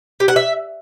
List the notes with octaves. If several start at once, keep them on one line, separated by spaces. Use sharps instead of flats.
G4
F#5
E5